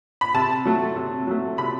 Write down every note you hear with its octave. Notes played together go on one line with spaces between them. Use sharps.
B5
C3 A5
F#3 A3
C3
F#3 A3
C3 B5